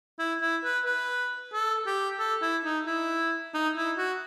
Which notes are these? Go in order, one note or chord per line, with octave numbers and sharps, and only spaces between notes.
E4
E4
B4
B4
A4
G4
A4
E4
D#4
E4
D#4
E4
F#4